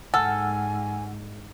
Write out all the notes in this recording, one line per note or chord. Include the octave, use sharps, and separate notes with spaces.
G#2 A4 F#5 G#5 E6 F6